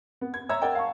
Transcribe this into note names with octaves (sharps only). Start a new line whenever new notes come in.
B3
G#6
C#5 E5 A#5 E6 G#6
A#4 D5 F#5 G5
F5 A5 C#6